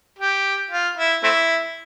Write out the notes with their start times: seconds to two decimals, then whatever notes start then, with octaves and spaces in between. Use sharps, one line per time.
0.19 G4
0.71 F4
0.97 E4
1.23 A3 C4 E4